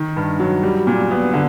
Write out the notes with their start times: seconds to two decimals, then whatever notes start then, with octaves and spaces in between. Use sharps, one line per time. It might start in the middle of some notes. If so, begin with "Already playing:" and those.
Already playing: D#3
0.16 G2
0.39 F#3
0.63 G3
0.87 A#2
1.11 B3
1.34 D3